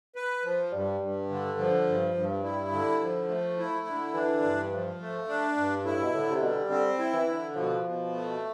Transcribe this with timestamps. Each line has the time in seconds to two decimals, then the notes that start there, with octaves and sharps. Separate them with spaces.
0.16 B4
0.44 F3
0.72 G2 G3
1.01 G2
1.29 D3
1.58 F3
1.87 G2
2.14 G2
2.43 G3 E4
2.72 D3
3.00 F3
3.28 A3
3.58 E4
3.86 D3
4.14 E3 D4
4.43 G2
4.71 F3
5.00 A3
5.28 D4
5.57 G2
5.85 A2 E4
6.02 B2
6.14 A2 D3
6.30 C3
6.42 B2 G3
6.70 D3 C4
6.99 E4
7.13 E3
7.27 D3
7.55 B2 F3
7.84 B2
8.13 A3